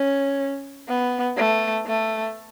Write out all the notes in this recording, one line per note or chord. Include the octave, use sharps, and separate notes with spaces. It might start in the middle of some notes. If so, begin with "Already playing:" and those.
Already playing: C#4
B3
A3
A3